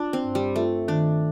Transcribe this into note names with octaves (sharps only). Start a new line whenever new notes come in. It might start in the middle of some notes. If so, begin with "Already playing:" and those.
Already playing: D4 F4
C4
G2
G3
A3 F4
D#3 D4